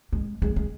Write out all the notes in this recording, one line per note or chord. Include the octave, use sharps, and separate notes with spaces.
G#3
G#3
G#3